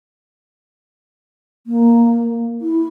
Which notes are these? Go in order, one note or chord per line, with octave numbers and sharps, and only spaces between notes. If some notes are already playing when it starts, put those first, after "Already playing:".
A#3
E4